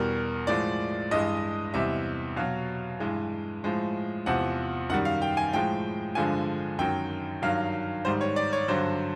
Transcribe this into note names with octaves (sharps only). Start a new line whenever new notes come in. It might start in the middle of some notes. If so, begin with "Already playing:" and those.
Already playing: E2 B2 G3 A#4
A2 F3 G#3 D5
G2 E3 G#3 D#5
E2 C3 E3 G3 E5
B2 F#3 F5
G2 E3 G#3
A2 F3 G#3
E2 C3 F3 F#5
F#2 D#3 G3 F#5
F5
G5
G#5
A2 F3 G#3 G5
G2 D3 F3 G#3 G#5
F#2 D#3 F#3 G5
G2 D#3 F#3 F5
G#2 D#3 G3 C5
C#5
D5
C#5
G2 D3 F#3 C5